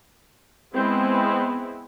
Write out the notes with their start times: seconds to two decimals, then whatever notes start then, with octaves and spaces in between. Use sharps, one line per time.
0.76 G#3 B3 C4 E4